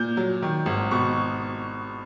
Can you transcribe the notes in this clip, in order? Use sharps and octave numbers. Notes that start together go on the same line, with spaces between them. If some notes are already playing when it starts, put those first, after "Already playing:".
Already playing: A#2 G6
F#3
D#3
G#1
B2 C#6